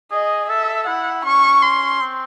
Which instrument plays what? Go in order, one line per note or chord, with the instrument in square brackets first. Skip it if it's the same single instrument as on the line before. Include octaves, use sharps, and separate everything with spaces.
[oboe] G#4 [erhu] D#5
[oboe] A4 [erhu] E5
[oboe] E4 [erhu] F#5
[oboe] C#4 [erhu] C#6
[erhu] C6
[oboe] C4